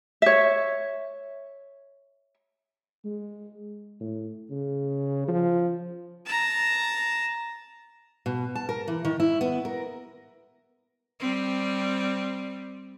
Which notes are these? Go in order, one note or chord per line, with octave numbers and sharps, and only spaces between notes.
C#5 E5
G#3
A2
C#3
F3
A5 A#5
B2
A5
A#4
E3
D#3
E4
B3
A#4
G3 C4